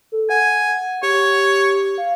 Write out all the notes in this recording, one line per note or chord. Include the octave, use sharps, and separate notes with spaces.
A4
F#5 G#5
G4 C#5
F5